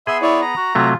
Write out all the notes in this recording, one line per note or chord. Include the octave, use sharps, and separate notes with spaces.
B3 G#4 E5 C6
E4 C#5 D5
A#5
F#4
C3 F#3 A3 F4